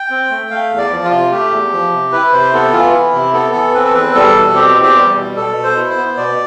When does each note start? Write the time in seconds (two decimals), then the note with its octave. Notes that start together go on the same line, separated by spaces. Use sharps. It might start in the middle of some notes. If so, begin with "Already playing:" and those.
Already playing: G5
0.10 C4
0.30 A3
0.51 A3 F5
0.70 E2
0.78 D5
0.91 F3
1.05 F4
1.11 C3
1.31 A3 G4
1.51 E2
1.72 F3
1.93 C3
2.12 E4 B4
2.33 C3 C5
2.53 B3 A4
2.73 E3 F4
2.93 E4
3.14 C3
3.34 B3 A4
3.55 E3
3.74 C4 B4
3.84 A4
3.94 E2 B4
4.15 G3 A4
4.36 B2
4.55 C4 G4
4.75 E2
4.82 G4
4.96 G3
5.16 B2
5.37 B2 A4
5.57 B2
5.63 C5
5.77 E4
5.90 C5
5.97 B3
6.17 B2 D5